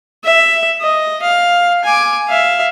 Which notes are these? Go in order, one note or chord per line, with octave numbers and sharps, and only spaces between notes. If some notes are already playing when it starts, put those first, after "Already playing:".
E5
D#5
F5
G#5 D6
E5 F5